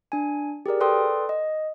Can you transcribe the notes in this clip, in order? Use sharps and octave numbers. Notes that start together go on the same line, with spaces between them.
D4 G#5
G4 G#4 A#4 D5
A4 B4 D5 G5 C6 D#6
D#5